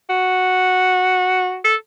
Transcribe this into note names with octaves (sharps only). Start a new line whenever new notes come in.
F#4
A4